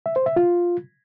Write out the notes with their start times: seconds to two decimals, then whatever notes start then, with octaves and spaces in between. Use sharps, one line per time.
0.06 E5
0.16 C5
0.26 E5
0.36 F4